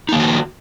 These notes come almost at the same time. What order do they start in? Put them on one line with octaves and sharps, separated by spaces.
D#4 A#3 D#3 F#4